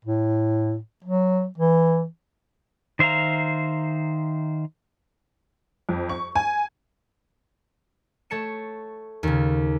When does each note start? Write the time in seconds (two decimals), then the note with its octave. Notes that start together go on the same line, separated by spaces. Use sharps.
0.04 A2
1.04 F#3
1.58 E3
2.99 D#3 C5 E5 F5 A#5
5.89 F2
6.09 C#6
6.35 G#5
8.30 A3 C#5 A5 C#7 E7
9.23 D#2 C#3